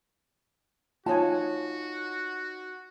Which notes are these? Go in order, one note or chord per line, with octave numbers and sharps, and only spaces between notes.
D#4 F4 F#4 C#5 G#5 A5